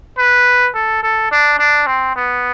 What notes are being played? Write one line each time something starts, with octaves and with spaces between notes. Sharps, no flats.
B4
A4
A4
D4
D4
C4
B3